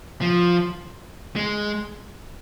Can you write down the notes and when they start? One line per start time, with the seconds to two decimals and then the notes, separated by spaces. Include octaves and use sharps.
0.21 F3
1.36 G#3